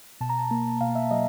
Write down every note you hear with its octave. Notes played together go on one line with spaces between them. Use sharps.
B2 A5
A#5
A5
A#3 A#5
B2 F5
E5
F#3 D#5